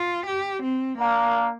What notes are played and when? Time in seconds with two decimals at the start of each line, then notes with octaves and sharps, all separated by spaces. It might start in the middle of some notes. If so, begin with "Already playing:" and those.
Already playing: F4
0.27 G4
0.63 C4
0.98 A#3 D4 A#4 F5